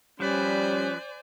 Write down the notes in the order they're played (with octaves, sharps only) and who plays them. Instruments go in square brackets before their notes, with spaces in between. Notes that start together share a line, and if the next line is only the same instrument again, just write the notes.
[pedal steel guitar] F3 B4 [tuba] G3 [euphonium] C#4 [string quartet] C5 D5 G#5